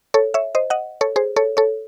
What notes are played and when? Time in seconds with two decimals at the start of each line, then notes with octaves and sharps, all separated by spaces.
0.14 A4 C#5
0.34 C#5 E5
0.55 C5 D#5
0.70 D#5 F#5
1.01 A4 C#5
1.16 G#4 C5
1.36 A4 C#5
1.57 A4 C#5